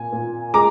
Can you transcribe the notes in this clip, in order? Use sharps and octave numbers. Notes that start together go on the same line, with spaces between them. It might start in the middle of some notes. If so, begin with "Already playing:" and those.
Already playing: A#2 G#5
A#2
G#3 A#5 D6